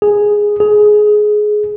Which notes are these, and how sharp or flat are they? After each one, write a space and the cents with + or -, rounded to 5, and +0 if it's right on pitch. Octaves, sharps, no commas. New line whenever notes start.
G#4 -5
G#4 +15